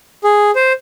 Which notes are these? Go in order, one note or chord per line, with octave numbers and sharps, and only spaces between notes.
G#4
C5